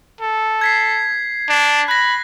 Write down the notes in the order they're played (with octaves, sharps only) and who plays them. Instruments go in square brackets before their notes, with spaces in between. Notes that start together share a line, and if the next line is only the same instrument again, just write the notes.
[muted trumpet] A4
[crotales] G#6 B6 C7
[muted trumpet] D4
[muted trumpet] B5 [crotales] F#6 A#6